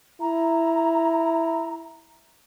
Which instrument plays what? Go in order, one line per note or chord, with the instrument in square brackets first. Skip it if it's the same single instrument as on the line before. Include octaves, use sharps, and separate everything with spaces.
[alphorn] E4 [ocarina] A#5